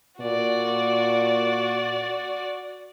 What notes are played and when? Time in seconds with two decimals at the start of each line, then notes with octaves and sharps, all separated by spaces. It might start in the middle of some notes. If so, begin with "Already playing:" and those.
0.21 A#2 F#4 D5